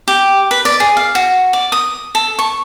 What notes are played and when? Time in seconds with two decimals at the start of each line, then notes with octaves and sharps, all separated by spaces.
0.08 G4
0.51 B4
0.65 D5
0.80 G#4
0.97 F5
1.15 F#4
1.53 D5
1.72 D#6
2.15 A4
2.39 C#6